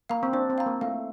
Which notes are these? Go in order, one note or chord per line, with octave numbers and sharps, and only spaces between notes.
A#3 F5 A#5
C4
D4 C5
C4
F5 A#5
A#3
A3 F5